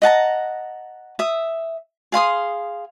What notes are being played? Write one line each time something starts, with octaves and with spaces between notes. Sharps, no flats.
D#5 F#5 A5 A#5
E5 D#6
G#4 F5 C6 D#6